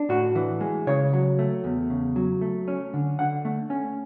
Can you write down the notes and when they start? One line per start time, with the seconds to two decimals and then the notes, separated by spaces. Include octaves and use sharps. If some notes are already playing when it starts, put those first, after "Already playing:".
Already playing: D4
0.09 A2 F#4
0.35 E3
0.61 G#3
0.87 C#3 C#5
1.13 F#3
1.39 A3
1.64 E2
1.90 C#3
2.16 F#3
2.41 A3
2.68 C#4
2.94 D3
3.19 D3 F#5
3.45 A3
3.70 C#4